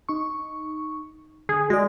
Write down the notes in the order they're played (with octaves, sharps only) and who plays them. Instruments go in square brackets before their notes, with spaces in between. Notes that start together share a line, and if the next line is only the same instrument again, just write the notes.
[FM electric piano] D#4 C#6
[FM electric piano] D3 [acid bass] G#4
[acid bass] G#3 [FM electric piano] F#4 D5